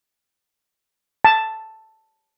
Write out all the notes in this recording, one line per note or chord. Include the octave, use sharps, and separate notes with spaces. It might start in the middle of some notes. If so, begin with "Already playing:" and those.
A5